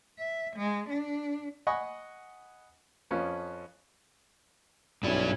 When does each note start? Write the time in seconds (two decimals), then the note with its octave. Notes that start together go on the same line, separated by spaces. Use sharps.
0.19 E5
0.57 G#3
0.89 D4
1.67 D#5 F#5 G#5 B5 C#6 D#6
3.11 F2 F3 C#4 F4 B4
5.03 B1 G2 C#4 E4 D5